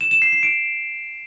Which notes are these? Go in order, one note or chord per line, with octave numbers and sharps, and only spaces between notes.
E7
E7
C7
C7
D7